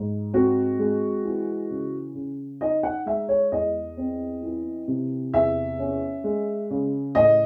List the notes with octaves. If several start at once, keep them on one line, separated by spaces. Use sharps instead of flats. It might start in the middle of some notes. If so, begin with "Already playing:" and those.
Already playing: G#2
C4 F#4
G#3
E3
C#3
C#3
D#4 D#5
F#5
G#3 E5
C#5
E2 D#5
C4
E3
C3
E2 E5
C#4
G#3
C#3
A2 D#5